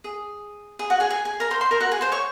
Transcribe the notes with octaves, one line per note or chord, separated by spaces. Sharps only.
G#4
G#4
F#4 F#5
G#4 G#5
G#4 G#5
G#4 G#5
A#4 A#5
C5 C6
C5 C6
A#4 A#5
F#4 F#5
G#4 G#5
C5 C6
C#5 C#6